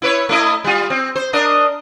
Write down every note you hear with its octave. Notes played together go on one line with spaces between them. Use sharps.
E4 B4 C#5
A3 E4 D#5
G3 F4
C4
C5
D4 A#4 D#5